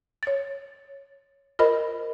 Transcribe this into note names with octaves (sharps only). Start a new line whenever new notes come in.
C#5 A6
F4 A#4 C5 D#5 B5